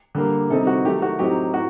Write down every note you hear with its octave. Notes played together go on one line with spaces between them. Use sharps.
D3 G3 A#3
C3 D#3 G3 C4 D#4 A4
F#4
D#3 F#3 A3 G4
F#4
A2 F#3 C4 D#4 G4
A2 F#4